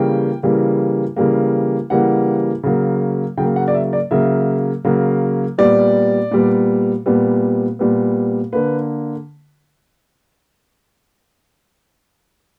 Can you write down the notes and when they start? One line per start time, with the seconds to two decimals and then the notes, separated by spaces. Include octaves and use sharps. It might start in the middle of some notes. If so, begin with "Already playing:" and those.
Already playing: C#3 E3 G3 A#3 G5
0.43 C#3 E3 G3 A#3
1.16 C#3 E3 G3 A#3
1.90 C#3 E3 G3 A#3 F#5
2.63 C#3 F#3 A#3
3.37 C#3 F#3 A#3 G5
3.56 F#5
3.68 D5
3.75 E5
3.93 D5
4.11 C#3 F#3 A#3 E5
4.85 C#3 F#3 A#3
5.58 A#2 G3 B3 D5
6.31 A#2 G3 B3
7.06 A#2 G3 B3
7.79 A#2 G3 B3
8.53 D3 A#3 B4